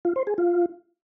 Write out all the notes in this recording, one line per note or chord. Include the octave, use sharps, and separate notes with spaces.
F4
C5
G#4
F4